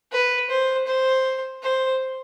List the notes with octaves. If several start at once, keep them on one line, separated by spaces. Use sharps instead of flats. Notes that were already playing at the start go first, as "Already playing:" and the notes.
B4
C5
C5
C5